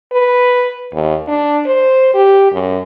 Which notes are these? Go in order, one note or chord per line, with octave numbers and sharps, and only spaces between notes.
B4
D#2
D4
C5
G4
F#2